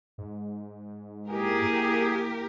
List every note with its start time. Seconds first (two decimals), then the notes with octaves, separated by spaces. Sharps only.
0.18 G#2
1.29 A#3 E4 G4 G#4 A#4